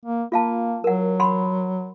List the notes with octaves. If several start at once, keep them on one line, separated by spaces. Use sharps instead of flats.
A#3
A#3 F4 F5 A5
F#3 A#4 F#5
F#5 B5 C6